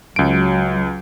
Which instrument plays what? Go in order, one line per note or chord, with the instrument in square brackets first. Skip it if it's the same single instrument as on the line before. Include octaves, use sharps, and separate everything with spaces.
[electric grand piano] C#2 D7 [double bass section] F#3